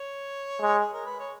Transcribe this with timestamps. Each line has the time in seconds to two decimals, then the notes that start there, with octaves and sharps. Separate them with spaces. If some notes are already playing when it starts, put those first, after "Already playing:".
Already playing: C#5
0.61 G#3
0.79 G#4
0.93 A#4
1.05 B4
1.19 C#5